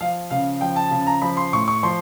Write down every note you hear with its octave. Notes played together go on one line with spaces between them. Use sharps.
F3 F5
C#3 F5
F3 G5
A5
C#3 A5
A#5
F3 B5
C6
A2 C#6
C#6
F3 C6